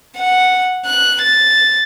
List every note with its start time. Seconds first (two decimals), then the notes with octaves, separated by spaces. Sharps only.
0.16 F#5
0.85 F#6
1.22 A6